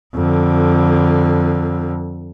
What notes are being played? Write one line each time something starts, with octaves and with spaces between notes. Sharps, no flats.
F2 D3